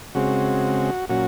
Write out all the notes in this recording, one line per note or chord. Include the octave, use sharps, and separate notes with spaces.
C#3 G#3 C4 F#4
A#2 F#3 C#4 F#4